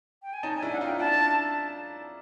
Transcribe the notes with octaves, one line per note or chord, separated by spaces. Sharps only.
G5
G#5
C#4 D#4 A5
G#5
D4 E4
F#5
D#4 F4 G5
D4 E4 A5